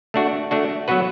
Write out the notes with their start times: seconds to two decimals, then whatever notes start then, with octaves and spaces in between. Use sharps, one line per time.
0.14 A3 D4 F#4
0.51 A3 D4 F#4
0.88 F#3 B3 F#4 B4